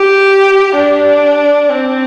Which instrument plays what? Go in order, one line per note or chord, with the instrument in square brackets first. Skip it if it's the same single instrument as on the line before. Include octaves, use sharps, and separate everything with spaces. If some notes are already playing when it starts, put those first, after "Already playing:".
Already playing: [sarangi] G4
D4
C4